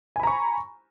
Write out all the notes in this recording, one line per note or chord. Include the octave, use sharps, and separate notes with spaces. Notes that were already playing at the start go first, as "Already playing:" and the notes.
G#5 A#5 B5 C#6